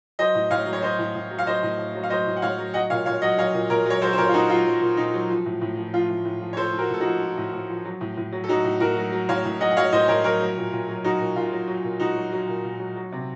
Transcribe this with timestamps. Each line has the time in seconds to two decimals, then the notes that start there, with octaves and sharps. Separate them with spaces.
0.19 F#3 C5 D#5
0.35 A2
0.51 A2 C#5 F5
0.67 F#3
0.73 C#5
0.82 F#3 C5 D#5
0.99 A2
1.15 A2
1.31 F#3
1.39 F5
1.47 F#3 C5 D#5
1.63 A2
1.78 A2
1.95 F#3
2.03 F5
2.10 F#3 C5 D#5
2.26 A2
2.37 F#5
2.42 A2 C#5 F5
2.58 F#3
2.74 F#3 D#5 F#5
2.90 A#2 C#5 F5
3.06 A#2 C#5 F5
3.22 F#3 D#5 F#5
3.38 F#3 C#5 F5
3.54 A#2
3.70 A#2 A#4 C#5
3.86 F#3 C#5
4.02 F#3 A4 C5
4.13 C5
4.18 A#2 A#4 C#5
4.29 F4
4.33 A#2 D#4 F#4
4.50 F#3 F4
4.66 F#3
4.82 A#2
4.97 A#2 D#4
5.14 F#3
5.30 F3
5.46 A2
5.62 A2
5.77 F3
5.93 F3 F4
6.10 A2
6.25 A2
6.41 F3
6.53 C#5
6.57 F3 A4 C5
6.73 A2
6.78 F#4 A#4
6.90 A2 A4
7.00 D#4 F#4
7.06 F3
7.22 F3
7.38 A2
7.53 A2
7.69 F3
7.85 F#3
8.01 A2
8.17 A2
8.32 F#3
8.44 A4
8.48 F#3 D#4 F#4
8.65 A2
8.80 A2 F#4 A#4
8.97 F#3
9.12 F#3
9.29 A2 C#5 F5
9.45 A2
9.61 F#3 D#5 F#5
9.71 F#5
9.77 F#3 C#5 F5
9.93 A2 C5 D#5
10.08 A2 A#4 C#5
10.24 F#3 A#4 C#5
10.40 F#3
10.57 A#2
10.72 A#2
10.88 F#3
11.04 F#3 D#4 F#4
11.20 A#2
11.36 A#2 F4
11.52 F#3
11.68 F#3
11.84 A#2
12.00 A#2 D#4 F#4
12.16 F#3
12.32 F#3
12.48 A#2
12.64 A#2
12.79 F#3
12.96 F#3
13.12 C3